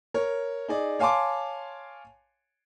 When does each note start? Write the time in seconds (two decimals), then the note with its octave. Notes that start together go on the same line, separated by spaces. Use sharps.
0.14 A#4 C#5
0.68 D#4 G#4 D5
0.99 C#5 F5 G#5 A5 C6 D6